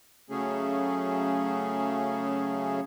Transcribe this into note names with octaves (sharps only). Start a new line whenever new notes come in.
C#3 F#3 A3 C#4 G#4